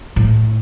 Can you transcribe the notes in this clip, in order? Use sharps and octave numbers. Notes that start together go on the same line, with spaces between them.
A2